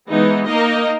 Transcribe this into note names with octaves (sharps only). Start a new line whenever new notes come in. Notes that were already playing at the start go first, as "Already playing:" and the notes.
E3 G#3 B3 D#4
A#3 D#4 A#4 D#5